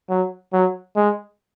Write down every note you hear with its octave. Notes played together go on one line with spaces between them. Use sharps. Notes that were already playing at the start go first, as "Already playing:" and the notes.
F#3
F#3
G#3